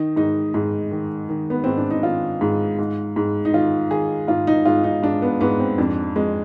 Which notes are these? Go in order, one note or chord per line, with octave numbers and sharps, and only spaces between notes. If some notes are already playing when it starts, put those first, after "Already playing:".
Already playing: D#3 D#4
G#2 D#4
G#2 D#4
D#3
D#3
B3
G#2 C4
D4
D#4
D#3 F4
G#2
G#2
G#2
D#4
D#3 F4
D#3 G#4
G#2 F4
D#4
G#2 F4
D#4
G#2 D4
B3
G#2 B3
C4
F2 D4
F2 G#3